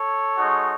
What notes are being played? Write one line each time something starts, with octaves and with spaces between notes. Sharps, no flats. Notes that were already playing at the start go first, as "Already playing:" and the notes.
Already playing: A4 C#5
G#3 D#4 F#4